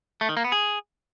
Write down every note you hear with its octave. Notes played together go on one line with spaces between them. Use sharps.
A3
D#3
A#3
B3
G#4